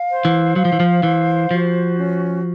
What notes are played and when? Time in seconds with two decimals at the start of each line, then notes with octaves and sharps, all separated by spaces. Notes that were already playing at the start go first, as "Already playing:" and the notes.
Already playing: F5
0.10 C5
0.25 E3
0.56 F#3 F5
0.65 F3
0.72 E3
0.80 F3
1.03 E3 C5
1.51 F3 F#4
1.97 C#4